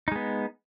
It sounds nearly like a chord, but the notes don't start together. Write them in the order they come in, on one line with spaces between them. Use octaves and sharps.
D#4 G#3 B3